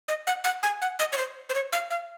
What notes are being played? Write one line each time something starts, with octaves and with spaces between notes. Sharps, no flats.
D#5
F#5
F#5
G#5
F#5
D#5
C#5
C5
C5
C#5
F5
F5